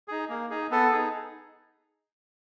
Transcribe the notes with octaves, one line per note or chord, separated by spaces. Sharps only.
D#4 G#4
A#3
D#4 G#4
B3 A4
D#4 G#4